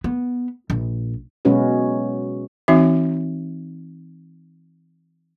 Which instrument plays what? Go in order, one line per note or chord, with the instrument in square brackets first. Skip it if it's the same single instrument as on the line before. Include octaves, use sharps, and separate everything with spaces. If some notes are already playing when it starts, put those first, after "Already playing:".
[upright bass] B3
A#1
[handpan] B2 F#3 G#3 C#4 F#4 B4
[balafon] E3 C4 D#4 F#4 E5